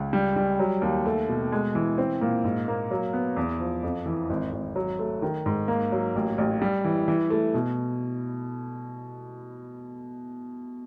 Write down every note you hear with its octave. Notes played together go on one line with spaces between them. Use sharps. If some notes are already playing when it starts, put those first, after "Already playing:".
Already playing: C#2
G3
G3
F#3
D#2
A3
B2
G#3
E3
C4
A#2
G#2
A#3
F#3
B3
E2
F3
F2
E3
G#1
G#1
F#3
A3
D#3
G#2
A#3
F#3
A1
A1
G3
E3
E3
A3
B2